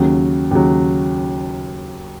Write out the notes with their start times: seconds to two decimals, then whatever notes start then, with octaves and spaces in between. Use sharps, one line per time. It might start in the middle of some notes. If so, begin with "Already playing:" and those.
Already playing: D#2 C#3 F#3
0.51 D#2 C#3 F#3